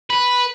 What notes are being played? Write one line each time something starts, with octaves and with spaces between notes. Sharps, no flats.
B4